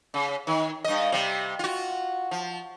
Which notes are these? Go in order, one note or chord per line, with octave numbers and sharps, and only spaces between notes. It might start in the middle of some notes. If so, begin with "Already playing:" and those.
C#3
D#3
G2 D#5
C3 G3
F4 F#4
F3